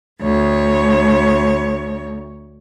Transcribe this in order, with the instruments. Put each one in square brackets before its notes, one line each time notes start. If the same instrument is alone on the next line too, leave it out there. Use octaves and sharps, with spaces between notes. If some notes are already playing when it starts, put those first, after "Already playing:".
[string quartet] D2 C#5